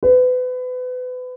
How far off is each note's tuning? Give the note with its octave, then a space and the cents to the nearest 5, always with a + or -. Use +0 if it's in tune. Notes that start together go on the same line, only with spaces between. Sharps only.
B4 +30